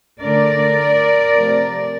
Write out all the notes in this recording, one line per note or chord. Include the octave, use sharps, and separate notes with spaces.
D3 A3 A#4 D5
C3 F3 A3